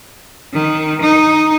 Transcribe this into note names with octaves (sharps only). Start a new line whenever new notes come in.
D#3
D#4